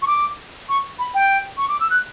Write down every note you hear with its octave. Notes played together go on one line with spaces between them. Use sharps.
C#6
D6
C#6
B5
G5
C#6
D6
E6
F#6